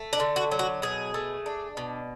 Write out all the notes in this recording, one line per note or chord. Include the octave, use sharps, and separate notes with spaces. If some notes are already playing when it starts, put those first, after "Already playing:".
Already playing: A3
D4
D3
F#4
F#3
F#4
B2 G#4
A3
D4
B2